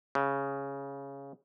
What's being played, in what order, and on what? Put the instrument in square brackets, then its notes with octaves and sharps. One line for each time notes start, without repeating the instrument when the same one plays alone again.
[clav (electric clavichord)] C#3